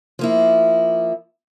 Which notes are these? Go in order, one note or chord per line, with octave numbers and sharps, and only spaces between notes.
F3 A#3 E4